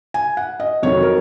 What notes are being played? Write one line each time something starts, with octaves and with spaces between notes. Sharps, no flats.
G#5
F#5
D#5
F2 D#3 F#3 C#5
A#4